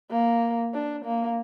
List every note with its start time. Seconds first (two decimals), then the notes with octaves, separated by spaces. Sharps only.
0.11 A#3
0.74 D4
1.05 A#3